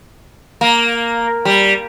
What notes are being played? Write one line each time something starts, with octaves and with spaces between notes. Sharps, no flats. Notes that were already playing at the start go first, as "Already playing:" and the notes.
A#3
G3